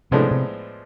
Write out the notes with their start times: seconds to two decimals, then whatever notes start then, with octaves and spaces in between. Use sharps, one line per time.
0.11 A2 C3 F3 G#3 B3 D4
0.31 C3